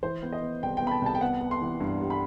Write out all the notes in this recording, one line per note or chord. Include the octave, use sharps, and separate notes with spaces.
E3 C5
B3
D#5
B3
C2 G5
B3 G5
B5
A5
C2 A5
G5
B3 F#5
B3
C6
E3
G2
G3
B5